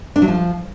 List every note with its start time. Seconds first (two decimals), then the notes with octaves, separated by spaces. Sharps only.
0.16 D4
0.22 F#3
0.28 F3